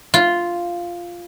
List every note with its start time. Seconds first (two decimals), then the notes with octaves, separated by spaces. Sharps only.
0.14 F4